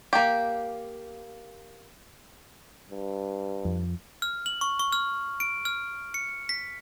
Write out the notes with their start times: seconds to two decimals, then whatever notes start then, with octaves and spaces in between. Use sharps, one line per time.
0.13 A#3 G4
2.90 G2
3.65 F2
4.22 F6
4.46 F#7
4.61 C#6
4.80 C#6
4.92 F6
5.40 D7
5.65 F6
6.14 C#7
6.49 B6